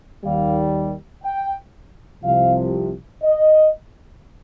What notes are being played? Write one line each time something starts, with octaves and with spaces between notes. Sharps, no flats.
D#2 D#3 G3 F5
G5
C2 C3 F3 F5
D#5